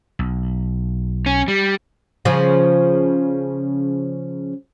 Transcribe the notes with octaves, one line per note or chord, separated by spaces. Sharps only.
B1
C#4
G3
C#3 F3